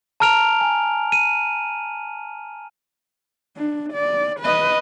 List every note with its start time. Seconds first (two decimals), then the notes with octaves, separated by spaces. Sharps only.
0.20 A5 A#5 F6 D7 F7
0.61 G#5
1.12 D#7
3.57 D4
3.93 D5
4.40 B4 D#5